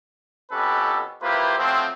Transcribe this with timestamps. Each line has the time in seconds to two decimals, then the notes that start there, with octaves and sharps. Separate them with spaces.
0.51 F2 B2 C#4 G4 A4 B4
1.22 A#3 E4 F4 G4 B4 C5
1.58 F3 F#3 A3 C4